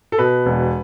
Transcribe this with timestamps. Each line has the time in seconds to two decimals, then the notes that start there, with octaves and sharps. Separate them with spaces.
0.12 A4
0.18 B2 B4
0.46 E1